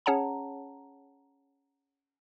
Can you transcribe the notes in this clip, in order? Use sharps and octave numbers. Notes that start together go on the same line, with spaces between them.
C#4 G#4 C#5 F#5 A5 A#5